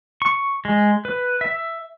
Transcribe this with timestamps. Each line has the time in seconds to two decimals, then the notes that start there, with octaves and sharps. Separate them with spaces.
0.22 C#6
0.65 G#3
1.05 B4
1.41 E5